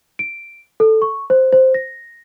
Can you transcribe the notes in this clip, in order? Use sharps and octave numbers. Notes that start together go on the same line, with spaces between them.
D7
A4
C#6
C5
C5
A#6